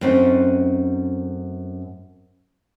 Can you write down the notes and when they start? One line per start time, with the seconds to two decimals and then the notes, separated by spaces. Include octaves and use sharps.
0.01 F#2 A3 C4 C#4 D#4